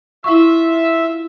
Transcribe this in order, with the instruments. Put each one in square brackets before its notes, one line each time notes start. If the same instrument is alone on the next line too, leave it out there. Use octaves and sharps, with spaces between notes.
[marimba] E4 C#6 [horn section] F4 E5